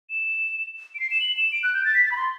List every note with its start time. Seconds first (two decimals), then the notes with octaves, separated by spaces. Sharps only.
0.10 E7
0.95 D7
1.00 C7
1.11 E7
1.20 F#7
1.37 E7
1.52 D7
1.63 F#6
1.74 G6
1.85 A6
1.94 B6
2.05 A6
2.12 B5
2.17 C6